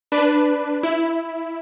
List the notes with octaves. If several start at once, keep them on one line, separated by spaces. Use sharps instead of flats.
D4 B4
E4